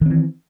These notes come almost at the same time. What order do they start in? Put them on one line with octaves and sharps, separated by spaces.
D#3 C4 E3